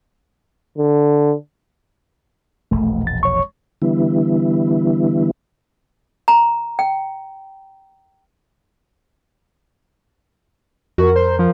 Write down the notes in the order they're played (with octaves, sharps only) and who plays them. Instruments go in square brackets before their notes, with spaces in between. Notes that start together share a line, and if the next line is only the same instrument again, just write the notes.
[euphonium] D3
[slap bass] E1 A#1 [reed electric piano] A3
[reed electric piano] A6
C#5 C#6
[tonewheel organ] D3 E3 G3 B3 E4
[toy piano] A#5
G5
[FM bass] F2 [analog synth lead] F#4 [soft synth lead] A#4
[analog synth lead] C5
F3